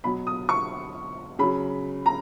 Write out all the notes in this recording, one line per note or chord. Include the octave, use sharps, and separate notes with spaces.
B2 F#3 B5
D#6
C#6
C#3 F#3 B5
A#5